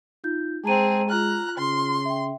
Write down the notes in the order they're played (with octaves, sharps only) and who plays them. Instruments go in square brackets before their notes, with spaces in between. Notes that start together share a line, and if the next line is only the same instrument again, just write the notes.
[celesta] D#4 F4 G6
[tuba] G#3 [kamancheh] C4 G#4 [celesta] A5 A#5 D#7
[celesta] F4 F6 [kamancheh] A#5 F#6
[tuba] C#3 [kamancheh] C6
[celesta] E5 G5